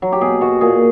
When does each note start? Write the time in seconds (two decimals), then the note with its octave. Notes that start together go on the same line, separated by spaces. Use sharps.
0.02 F#3
0.12 G4
0.21 B2 G#4
0.41 B2 F#4
0.61 A#2 G#4